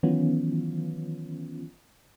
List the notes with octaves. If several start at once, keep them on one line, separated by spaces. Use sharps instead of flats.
D#3 E3 F#3 B3 C#4 F4